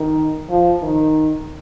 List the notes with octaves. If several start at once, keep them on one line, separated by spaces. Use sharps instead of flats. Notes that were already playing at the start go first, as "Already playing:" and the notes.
Already playing: D#3
F3
D#3